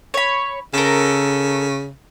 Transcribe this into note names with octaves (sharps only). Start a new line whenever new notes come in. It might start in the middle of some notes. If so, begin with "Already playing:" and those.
C#5 B5
C#3 A4 A#4